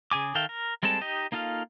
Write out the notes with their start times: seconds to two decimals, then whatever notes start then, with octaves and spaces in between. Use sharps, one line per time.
0.11 C#3 G#4 G#5 D6
0.35 D#3 A4 E5 F5 G5
0.49 A#4
0.83 G3 G#3 C4 A4 A5
1.01 D#4 G4 D#5
1.32 A#3 D#4 F4 A4 F5